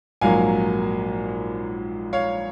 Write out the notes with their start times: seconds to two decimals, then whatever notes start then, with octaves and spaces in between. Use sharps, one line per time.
0.21 A#1 G#2 F#3 A#3 F5 G#5
2.13 C#5 F5